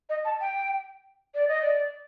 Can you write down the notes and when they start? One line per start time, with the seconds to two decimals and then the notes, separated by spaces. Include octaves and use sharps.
0.09 D#5
0.25 A5
0.41 G5
1.35 D5
1.48 D#5
1.62 D5